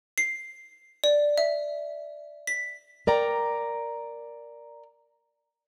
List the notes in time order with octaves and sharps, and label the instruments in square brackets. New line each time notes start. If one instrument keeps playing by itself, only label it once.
[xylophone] C7
D5
E5
B6
[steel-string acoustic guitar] A#4 D5 G5 A#5